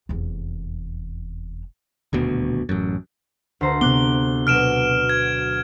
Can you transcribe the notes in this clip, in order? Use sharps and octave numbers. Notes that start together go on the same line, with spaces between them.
F1 E2
D#1 D2 B2
A1 F#2
D2 C5 A#5
C3 B3 D6 F#6 G7
B2 F#3 F6 D7 E7
G#6